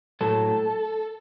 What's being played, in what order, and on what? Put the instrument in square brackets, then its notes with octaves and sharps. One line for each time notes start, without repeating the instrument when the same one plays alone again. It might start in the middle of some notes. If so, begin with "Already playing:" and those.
[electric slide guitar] A2 F#3 A4